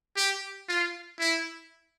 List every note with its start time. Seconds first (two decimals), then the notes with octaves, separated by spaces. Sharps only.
0.16 G4
0.68 F4
1.19 E4